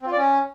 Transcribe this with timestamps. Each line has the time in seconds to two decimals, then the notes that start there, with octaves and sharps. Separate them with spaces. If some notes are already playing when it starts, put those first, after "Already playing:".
0.01 C4
0.06 F4
0.12 D5
0.18 C#4